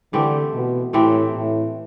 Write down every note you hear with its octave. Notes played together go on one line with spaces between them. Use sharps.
D3 E3 A3 C4 G4
B2
A2 E3 A3 C4 G4
A2